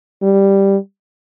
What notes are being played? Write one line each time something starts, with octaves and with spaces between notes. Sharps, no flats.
G3